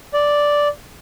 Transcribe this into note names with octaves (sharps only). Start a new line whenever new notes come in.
D5